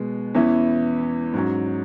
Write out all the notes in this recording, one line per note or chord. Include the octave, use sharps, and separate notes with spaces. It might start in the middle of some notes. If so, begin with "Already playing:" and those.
Already playing: B2 G#3 B3
E2 E3 C#4 E4
G#2 F#3 C#4